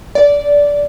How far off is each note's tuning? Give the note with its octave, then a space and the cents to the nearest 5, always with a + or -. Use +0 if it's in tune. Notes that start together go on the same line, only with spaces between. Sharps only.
D5 -15